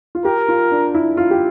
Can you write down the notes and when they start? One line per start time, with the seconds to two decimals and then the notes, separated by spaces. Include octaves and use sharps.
0.15 F4
0.25 G4 A#4
0.49 F4
0.72 D4
0.94 E4
1.17 F4
1.31 G4